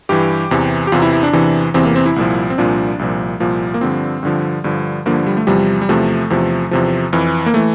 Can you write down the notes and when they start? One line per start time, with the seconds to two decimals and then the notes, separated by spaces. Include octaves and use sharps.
0.09 G2 E3 G4
0.51 E2 C3 E3
0.87 G4
0.92 E2 C3 E3 F4
1.02 E4
1.13 E4
1.23 D4
1.33 E2 C3 E3
1.74 E2 C3 E3 C4
1.85 A#3
1.96 C4
2.06 E4
2.16 C2 A#2 F3
2.50 C4
2.58 C2 A#2 F3 D4
2.99 C2 A#2 F3
3.40 C2 A#2 F3 A#3
3.74 A#3
3.81 G2 D3 F3 C4
4.23 G2 D3 F3
4.64 G2 D3 F3
5.06 G2 D3 F3 A#3
5.26 G3
5.37 A3
5.47 E2 C3 F3 G3
5.82 G3
5.89 E2 C3 F3 A3
6.30 E2 C3 F3
6.71 E2 C3 F3
7.13 F2 E3
7.46 A#3
7.54 E3 A3